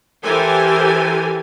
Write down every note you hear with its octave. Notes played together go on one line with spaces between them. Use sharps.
E3 G4 A4 A#4 C5 G#5